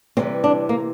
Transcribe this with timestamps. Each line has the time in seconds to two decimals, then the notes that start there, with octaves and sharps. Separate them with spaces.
0.17 C3 E3 G3 C4
0.44 D4
0.69 A#3